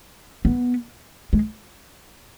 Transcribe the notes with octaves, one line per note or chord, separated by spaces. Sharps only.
B3
G#3